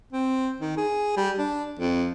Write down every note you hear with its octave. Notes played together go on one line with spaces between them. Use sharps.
C4
D#3
G#4
G3
D4
F2